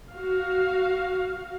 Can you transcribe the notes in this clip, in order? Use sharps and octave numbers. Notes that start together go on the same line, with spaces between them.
F#4 F5